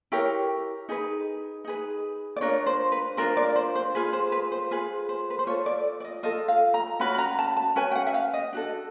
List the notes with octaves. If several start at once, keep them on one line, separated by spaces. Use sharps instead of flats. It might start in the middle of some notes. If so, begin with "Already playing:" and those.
E4 G4 A#4 C#5
D#4 G#4 B4
D#4 G#4 B4
D5
D4 F4 A#4 C#5
C5
B4
D4 F4 A#4 C5
D5
C5
C5
F4 G#4 B4
C5
B4
C5
F4 G#4 B4
C5
B4
C5
F4 A4 C#5
D5
D5
D#5
F4 A4 D#5
F5
A#5
C#4 F#4 B4 B5
B5
A#5
A5
A5
C#4 F#4 B4 G#5
G5
F#5
E5
F5
D#5
D4 F#4 A4